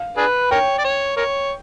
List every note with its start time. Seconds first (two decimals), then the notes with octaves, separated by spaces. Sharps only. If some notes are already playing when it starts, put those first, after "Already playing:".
Already playing: F5
0.17 D4 G#4 B4
0.51 A#4 C#5 G5
0.79 D5
0.85 C#5
1.17 A#4 C#5